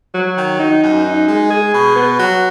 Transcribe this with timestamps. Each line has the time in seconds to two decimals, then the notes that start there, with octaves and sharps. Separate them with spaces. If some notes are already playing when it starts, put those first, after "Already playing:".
0.15 F#3
0.37 D#3
0.60 D#4
0.83 F#2
1.05 D#4
1.29 G#3
1.51 G#4
1.74 B2
1.96 B3
2.20 F#3